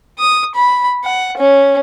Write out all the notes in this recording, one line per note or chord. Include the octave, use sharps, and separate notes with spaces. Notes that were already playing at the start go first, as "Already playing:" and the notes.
D#6
B5
F#5
C#4